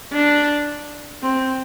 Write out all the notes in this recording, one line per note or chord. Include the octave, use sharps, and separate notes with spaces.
D4
C4